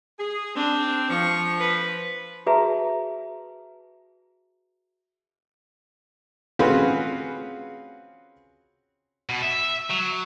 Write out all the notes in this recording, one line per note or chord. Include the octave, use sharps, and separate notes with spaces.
G#4
C4 D4
F3 C#6
B4
F#4 G#4 B4 E5 A5 A#5
C4 C#4 F4 F#4 G#4 B4
B2
E5
F#3